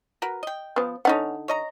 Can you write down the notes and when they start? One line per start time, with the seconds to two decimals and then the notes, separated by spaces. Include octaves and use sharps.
0.22 F#4 A#4 B4
0.43 D#5 G5
0.76 F3 B3
1.05 D3 B3 C#4 D#4 F#5
1.48 C#5 D#5 A#5